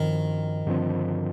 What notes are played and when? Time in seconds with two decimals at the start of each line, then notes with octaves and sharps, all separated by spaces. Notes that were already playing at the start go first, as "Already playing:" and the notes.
Already playing: G2 D#3 F3 C4
0.67 G2 D3 F3 C4